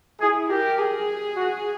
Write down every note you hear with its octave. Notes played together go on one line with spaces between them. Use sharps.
E4 G#4
G4 A#4
G#4
F#4